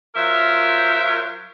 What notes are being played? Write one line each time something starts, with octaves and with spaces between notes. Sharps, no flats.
F#3 F4 A#4 C5 E5